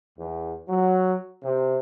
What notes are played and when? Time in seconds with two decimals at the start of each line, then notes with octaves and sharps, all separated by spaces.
0.18 E2
0.68 F#3
1.44 C3